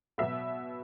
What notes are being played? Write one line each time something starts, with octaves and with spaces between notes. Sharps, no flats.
B2 F#3 B3 E5